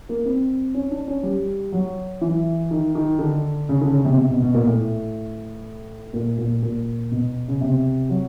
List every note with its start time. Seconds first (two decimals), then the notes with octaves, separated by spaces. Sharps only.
0.09 A#3
0.25 C4
0.74 C#4
0.91 D4
1.08 C#4
1.23 G3
1.72 F#3
2.21 E3
2.71 D#3
2.95 D#3
3.19 D3
3.69 C#3
3.81 D3
3.93 C#3
4.05 C3
4.17 C3
4.30 B2
4.42 B2
4.54 A#2
4.67 A2
6.13 A#2
6.38 A#2
6.63 A#2
7.12 B2
7.48 C#3
7.61 C3
8.09 F#3